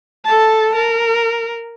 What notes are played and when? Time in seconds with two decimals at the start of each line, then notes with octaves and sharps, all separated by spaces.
0.25 A4 A5
0.75 A#4